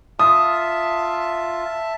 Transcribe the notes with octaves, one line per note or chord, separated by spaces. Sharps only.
F4 E5 A5 D#6